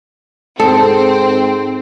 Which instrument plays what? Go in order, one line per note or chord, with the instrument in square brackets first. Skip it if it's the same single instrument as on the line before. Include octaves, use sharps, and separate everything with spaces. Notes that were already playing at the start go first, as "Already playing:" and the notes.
[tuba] G#2 [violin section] C4 [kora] A4